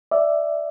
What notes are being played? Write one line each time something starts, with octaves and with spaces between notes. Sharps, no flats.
D5 E5